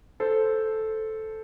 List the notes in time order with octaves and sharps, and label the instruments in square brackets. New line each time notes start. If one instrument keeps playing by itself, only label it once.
[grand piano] A4 C5